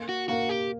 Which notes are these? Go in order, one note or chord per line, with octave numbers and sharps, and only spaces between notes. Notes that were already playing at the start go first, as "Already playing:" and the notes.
Already playing: A#3
F#4
A#3 F#4
G4